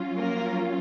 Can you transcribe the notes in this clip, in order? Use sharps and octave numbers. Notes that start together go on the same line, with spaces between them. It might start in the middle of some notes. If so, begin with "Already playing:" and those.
Already playing: F#3 C#4 F4
A#3 A#4